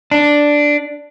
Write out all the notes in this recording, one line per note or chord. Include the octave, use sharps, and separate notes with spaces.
D4